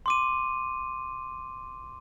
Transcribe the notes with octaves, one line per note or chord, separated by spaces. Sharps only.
C6 D6 D#7